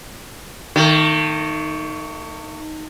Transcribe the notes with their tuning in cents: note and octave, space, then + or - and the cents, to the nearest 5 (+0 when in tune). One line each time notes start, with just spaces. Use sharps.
D#3 +0 A3 +40